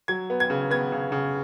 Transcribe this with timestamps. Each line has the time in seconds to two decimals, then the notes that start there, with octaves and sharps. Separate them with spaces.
0.08 F#3 G#6
0.30 B3
0.40 G#6
0.50 C#3
0.71 B3 G#6
0.92 C#3
1.12 C#3